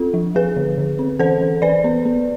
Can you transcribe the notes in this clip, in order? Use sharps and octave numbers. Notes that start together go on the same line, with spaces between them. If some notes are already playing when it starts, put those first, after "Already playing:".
Already playing: C4 F4 A4
F3
F3 G#4 B4
D3
D3
C4
E3 A4 C5
E3
E3 B4 D5
B3
B3